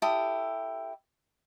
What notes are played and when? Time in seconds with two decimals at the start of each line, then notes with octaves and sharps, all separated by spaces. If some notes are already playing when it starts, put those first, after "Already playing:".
0.02 E4 G4 A4 D#6